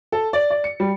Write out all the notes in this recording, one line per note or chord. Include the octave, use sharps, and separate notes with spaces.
A4
D5
D5
C#7
G3